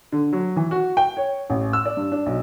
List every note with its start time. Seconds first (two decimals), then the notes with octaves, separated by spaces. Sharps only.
0.12 D3
0.33 F#3
0.56 E3
0.71 F#4
0.97 G5
1.17 C#5
1.50 A1
1.73 E6
1.85 D5
1.97 G2
2.12 D4
2.26 B1